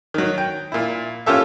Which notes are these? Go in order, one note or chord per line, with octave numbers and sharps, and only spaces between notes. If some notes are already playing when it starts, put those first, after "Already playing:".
D#3 F#3
G5
A#2 E4
A#3 C#4 F4 G4 A4 E5